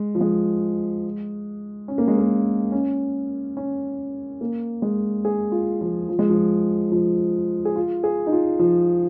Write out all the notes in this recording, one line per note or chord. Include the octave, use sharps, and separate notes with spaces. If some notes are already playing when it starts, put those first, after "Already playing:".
Already playing: G#3
F3
G#3
C#4
A#3
G#3
A#3
C#4
C#4
A#3
G#3
G#4
F4
F3
F3
G#3
F3
F3
G#4
F4
G#4
D#4
F4
F3